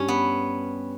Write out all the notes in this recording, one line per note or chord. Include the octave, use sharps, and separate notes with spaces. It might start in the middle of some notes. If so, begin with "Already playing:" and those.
Already playing: G2 C#4
B3